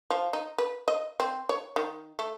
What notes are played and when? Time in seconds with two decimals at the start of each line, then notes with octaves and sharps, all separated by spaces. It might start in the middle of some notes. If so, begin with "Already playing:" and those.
0.10 F3
0.33 D#4
0.58 B4
0.88 D#5
1.20 C4
1.49 C#5
1.76 D#3
2.19 A3